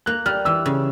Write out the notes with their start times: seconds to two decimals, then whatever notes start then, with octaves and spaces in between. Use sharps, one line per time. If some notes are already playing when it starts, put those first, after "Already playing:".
0.06 A#3 F#6
0.26 G3 F6
0.45 E3 E6
0.66 C#3